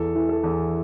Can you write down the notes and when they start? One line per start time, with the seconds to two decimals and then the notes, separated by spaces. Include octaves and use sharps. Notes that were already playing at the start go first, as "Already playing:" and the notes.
Already playing: E2 A4
0.15 E3
0.29 A4
0.43 E2